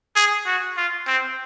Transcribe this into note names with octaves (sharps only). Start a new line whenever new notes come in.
G#4
F#4
F4
C4